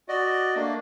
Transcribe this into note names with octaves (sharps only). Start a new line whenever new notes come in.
F#4 D5 D#5
A3 A#3 D4